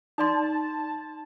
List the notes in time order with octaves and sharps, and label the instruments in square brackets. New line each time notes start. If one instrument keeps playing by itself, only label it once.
[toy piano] D#4 D5 C6 [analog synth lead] A5